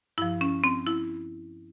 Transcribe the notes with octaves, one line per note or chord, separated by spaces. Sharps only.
G2 F3 E4
C#4
C4
E4